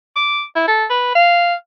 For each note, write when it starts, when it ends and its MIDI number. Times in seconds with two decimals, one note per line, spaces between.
0.16 0.43 86
0.56 0.64 64
0.68 0.85 69
0.90 1.10 71
1.15 1.54 77